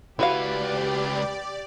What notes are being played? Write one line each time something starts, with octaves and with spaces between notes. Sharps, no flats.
C#2 E4 F#4 G4 B4 D5 F5